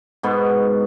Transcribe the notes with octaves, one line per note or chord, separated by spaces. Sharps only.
G#2 B2 B3